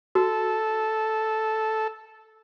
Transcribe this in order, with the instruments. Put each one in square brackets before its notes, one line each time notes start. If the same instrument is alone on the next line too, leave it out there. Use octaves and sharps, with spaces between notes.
[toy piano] F#4 [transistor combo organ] A4